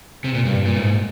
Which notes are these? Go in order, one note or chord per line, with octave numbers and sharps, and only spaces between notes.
C3
A#2
G2
A#2
G#2